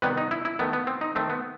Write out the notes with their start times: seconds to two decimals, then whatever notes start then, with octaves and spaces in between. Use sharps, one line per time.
0.02 C3 D#3 G3 B3 B4
0.17 D#4
0.31 E4
0.45 E4
0.59 D#3 A3 B3
0.73 B3
0.87 C4
1.01 D#4
1.15 D#3 A3 C4
1.30 B3